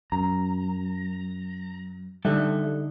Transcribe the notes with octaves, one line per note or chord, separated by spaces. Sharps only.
F#2 A#5
D3 G3 D#4 A4 E5 F#6